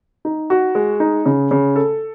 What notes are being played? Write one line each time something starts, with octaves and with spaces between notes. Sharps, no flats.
D#4
F#4
G#3
D#4
C#3
C#3
A4